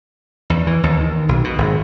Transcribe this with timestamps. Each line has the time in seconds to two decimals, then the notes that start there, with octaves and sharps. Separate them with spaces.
0.50 E2
0.67 E3
0.83 D#2
1.01 D#3
1.29 B1
1.44 B2
1.58 G#1